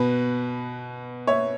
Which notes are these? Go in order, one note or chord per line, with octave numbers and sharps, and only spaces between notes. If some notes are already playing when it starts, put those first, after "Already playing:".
Already playing: B2 B4
C#5 E5